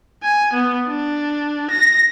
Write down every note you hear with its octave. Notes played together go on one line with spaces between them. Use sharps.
G#5
B3
D4
A#6